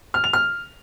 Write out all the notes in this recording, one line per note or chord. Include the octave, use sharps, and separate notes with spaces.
F6
F7
F6